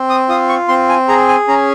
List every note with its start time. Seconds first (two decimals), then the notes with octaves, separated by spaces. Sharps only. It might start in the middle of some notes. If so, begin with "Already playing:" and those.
Already playing: C4
0.10 D#6
0.29 F4 D#6
0.49 C#6
0.69 C4 C6
0.89 G#5
1.08 G#4 A#5
1.28 G#5
1.48 C#4 A#5